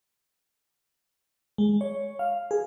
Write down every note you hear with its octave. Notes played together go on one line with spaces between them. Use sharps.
G#3
C#5
F5
G#4